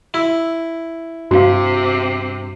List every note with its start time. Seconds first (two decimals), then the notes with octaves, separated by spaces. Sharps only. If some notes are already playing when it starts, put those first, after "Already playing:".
0.14 E4
1.31 G2 C3 F#4 F5